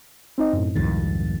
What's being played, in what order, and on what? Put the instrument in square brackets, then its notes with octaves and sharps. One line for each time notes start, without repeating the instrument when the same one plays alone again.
[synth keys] C4 D#4 D#5
F#2 A2
[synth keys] C2 A6 [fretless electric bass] F2 G#2 D#3